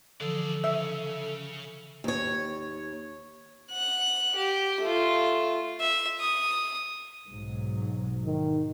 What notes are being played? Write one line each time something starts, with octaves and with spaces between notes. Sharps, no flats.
D3 E3 F3 G#4 A4 D5
C#3 E5
D#2 C#5
F#5 F#6
G4
A3 F4
E5
D#6
B1 G#2 F#3
D#3